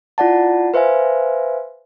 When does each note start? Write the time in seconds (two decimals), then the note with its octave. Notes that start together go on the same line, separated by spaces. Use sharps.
0.18 E4 F4 D5 F#5 A5
0.74 B4 C5 E5 F5 G#5